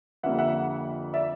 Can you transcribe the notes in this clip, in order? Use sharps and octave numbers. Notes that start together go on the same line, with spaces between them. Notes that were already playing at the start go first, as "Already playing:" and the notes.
F2 D3 G3 A#3 E5 F#5
E5 F#5
D5 E5